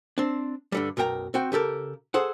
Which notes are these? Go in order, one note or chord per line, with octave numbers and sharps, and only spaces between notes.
C4 D4
G2 D3 G3
B1 F#2 A#4 G5 A#5
C4 F#4 G5
C#3 G4 A4 A#4
G#4 A4 C5 F#5